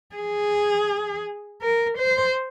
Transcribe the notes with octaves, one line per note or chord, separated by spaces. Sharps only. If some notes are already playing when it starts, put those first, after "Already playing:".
G#4
A#4
C5